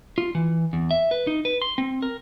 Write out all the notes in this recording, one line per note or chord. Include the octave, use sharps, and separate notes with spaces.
F4
E3
E2
E5
B4
D#4
B4
C6
C4
A#4